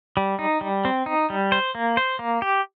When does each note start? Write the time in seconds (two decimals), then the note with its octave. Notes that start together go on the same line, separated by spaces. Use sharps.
0.17 G3
0.39 D#4
0.61 G3
0.85 C4
1.06 D#4
1.30 G3
1.52 C5
1.75 A#3
1.97 C5
2.19 A#3
2.42 G4